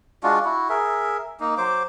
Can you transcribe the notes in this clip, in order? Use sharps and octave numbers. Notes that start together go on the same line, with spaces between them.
G#3 D4 F4 F#4
E4 F#4
G#4 A#4 E5
A#3 D#4
F#3 C5 D6